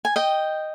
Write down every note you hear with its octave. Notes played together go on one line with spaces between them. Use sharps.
G#5
D#5 G5